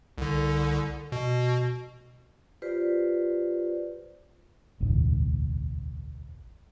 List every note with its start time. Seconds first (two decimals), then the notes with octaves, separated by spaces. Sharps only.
0.18 C2 D3
1.12 B2
2.62 F4 G4 B4 C5 D5
4.80 E1 A1 D2